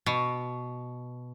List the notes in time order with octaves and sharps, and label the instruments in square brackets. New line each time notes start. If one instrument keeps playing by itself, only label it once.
[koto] B2